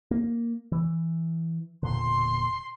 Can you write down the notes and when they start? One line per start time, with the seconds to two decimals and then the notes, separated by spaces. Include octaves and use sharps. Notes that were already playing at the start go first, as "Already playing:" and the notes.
0.11 A#3
0.72 E3
1.83 E1 A#2 D3 C6